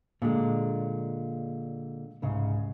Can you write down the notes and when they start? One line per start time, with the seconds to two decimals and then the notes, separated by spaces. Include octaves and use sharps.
0.22 A#2 D3 G#3
2.22 C2 G#2 C#3